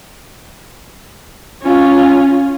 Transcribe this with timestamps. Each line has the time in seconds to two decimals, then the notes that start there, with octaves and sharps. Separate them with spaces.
1.63 C#4 F4